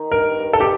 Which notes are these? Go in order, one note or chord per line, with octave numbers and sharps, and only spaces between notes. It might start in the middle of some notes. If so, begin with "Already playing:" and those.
Already playing: D#3 D#4
G2 A#4
G2
A4
G4